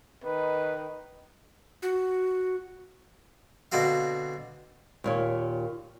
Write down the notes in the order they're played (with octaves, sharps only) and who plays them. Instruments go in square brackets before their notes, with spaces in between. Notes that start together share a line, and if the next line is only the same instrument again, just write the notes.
[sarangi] D#3 [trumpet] B4
[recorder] F#4
[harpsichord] B2 D3 C4 F#4 F5
[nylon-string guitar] D#2 A#2 C#5